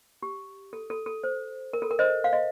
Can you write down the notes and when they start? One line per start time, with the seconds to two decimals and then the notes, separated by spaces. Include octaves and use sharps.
0.23 G4
0.73 A4
0.90 A4
1.06 A4
1.24 C5
1.73 A#4
1.82 A4
1.91 A#4
1.99 C5 D#5
2.24 F5
2.33 D#5